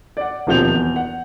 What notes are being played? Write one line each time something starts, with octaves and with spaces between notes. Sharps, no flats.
D5 F#5
D#1 B2 F3 C4 G6 F7
E2
F#5